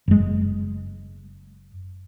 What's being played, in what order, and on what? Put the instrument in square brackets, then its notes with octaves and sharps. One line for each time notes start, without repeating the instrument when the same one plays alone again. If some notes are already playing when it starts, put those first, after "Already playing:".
[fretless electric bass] F#1 G#3